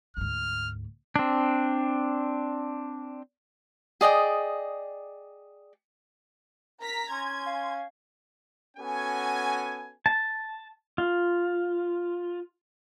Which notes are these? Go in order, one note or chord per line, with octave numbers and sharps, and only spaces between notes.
D2 G#2 F6
C4 D4
G#4 D5 D#5 G5
A#4 A#5 B6
C#4 G#5 C6 G#6
F5
B3 C#4 F#4 A4 G#5
A5
F4